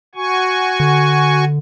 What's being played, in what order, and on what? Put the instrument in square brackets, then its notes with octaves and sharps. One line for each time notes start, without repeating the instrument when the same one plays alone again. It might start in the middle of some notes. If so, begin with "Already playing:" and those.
[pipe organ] F#4 G#5 C#6
[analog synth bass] D3